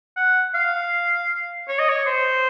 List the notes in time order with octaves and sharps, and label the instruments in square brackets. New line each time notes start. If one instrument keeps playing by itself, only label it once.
[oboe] F#5
F5
C#5
D#5
C#5
C5